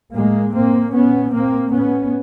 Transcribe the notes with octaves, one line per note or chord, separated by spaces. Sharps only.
A2 G#3 A#3
A2 A#3 C4
A#2 B3 C#4
A#2 A#3 C4
A2 B3 C#4